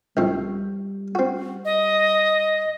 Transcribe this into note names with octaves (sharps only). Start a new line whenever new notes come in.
C2 F2 B2 G3
C4 F#4
D#5